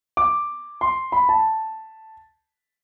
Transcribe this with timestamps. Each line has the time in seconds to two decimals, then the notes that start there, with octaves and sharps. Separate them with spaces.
0.17 D6
0.81 C6
1.12 B5
1.29 A5